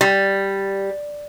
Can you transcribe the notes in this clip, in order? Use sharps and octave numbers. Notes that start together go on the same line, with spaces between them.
G3